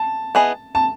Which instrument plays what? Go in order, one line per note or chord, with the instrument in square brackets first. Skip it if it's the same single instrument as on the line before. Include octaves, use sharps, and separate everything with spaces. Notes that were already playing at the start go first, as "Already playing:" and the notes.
Already playing: [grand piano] A5
[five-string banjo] B3 E4 G#4 D#5
[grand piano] A5